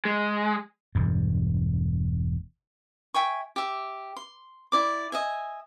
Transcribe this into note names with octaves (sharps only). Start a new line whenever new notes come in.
G#3
E1 G2
E5 G5 G#5 C#6
G4 E5
C6
E4 D5 D6
D#5 E5 G#5